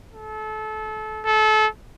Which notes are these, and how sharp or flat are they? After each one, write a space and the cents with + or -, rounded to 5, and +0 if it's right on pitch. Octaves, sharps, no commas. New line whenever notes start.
A4 -30
A4 -30